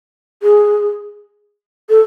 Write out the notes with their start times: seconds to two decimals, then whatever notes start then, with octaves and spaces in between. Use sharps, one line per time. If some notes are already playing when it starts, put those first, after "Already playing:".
0.43 G#4
1.89 A4